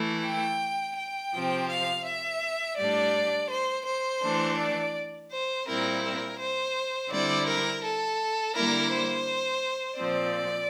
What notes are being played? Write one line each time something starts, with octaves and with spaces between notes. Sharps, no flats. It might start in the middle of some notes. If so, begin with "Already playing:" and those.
Already playing: E3 A3 E4
G5
G5
C3 F3 C4
F5
E5
A2 G3 D4 D5
C5
C5
E3 A3 D4
D5
C5
A#2 G3 C4 E4 A#4
A#4
C5
D3 G3 C4 E4 D5
A#4
A4
D3 G3 A#3 E4 A#4
C5
A#2 F3 C4 D5